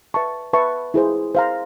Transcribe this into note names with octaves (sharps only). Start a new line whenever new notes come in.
B4 E5 A5 C#6
B4 E5 A5 C#6
E4 G#4 C5
C5 F5 A#5